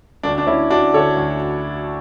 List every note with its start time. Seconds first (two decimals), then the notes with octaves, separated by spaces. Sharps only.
0.23 D2 D4
0.38 D4
0.47 D3 C#4 E4
0.70 D2 D4 F#4
0.94 D3 A4 C#5
1.16 D2